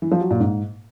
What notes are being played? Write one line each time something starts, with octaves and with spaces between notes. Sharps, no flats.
E3
F3
F#3
A#2
G#2